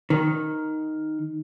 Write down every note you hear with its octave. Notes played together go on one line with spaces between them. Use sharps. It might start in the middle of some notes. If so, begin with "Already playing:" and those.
D#3